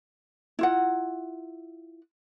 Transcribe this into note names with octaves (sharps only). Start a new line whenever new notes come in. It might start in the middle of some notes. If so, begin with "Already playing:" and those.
E4 F4 F#5